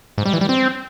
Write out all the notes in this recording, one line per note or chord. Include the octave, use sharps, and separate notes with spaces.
G#2
G3
E3
G3
C4